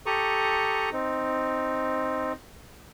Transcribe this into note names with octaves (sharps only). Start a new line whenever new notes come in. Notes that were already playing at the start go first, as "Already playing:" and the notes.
G4 A4 A#5 C#6 D#6
C4 D#4